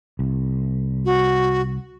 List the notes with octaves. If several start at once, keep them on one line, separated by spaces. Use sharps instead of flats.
C2
F#4